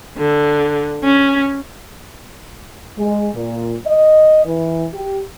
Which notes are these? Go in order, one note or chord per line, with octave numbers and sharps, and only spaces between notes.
D3
C#4
G#3
A#2
D#5
E3
G4